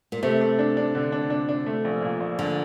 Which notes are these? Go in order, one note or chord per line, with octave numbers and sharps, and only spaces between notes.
A#2
C3 A3
A3
D4
D4
D3
D4
D4
D4
A3
A#1
A#2
A#1
A#1 D3